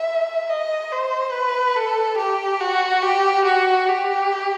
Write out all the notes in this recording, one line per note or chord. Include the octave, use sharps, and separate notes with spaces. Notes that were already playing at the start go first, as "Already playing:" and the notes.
Already playing: E5
D#5
C5
B4
A4
G4
F#4
G4
F#4
G4